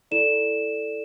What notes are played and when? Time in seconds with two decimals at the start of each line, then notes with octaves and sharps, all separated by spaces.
0.11 E4 A4 D5 E7